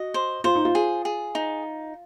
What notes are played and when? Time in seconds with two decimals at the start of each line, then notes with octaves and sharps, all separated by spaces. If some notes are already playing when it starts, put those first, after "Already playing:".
Already playing: F#4 D#5
0.14 C5
0.44 F4 C5
0.55 D#4
0.65 F4
0.75 G#4
1.05 G#4
1.35 D#4